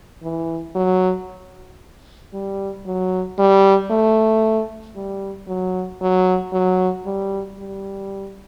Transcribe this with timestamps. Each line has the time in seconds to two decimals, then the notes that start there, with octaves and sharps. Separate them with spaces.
0.23 E3
0.75 F#3
2.33 G3
2.86 F#3
3.39 G3
3.90 A3
4.96 G3
5.48 F#3
6.01 F#3
6.53 F#3
7.06 G3
7.58 G3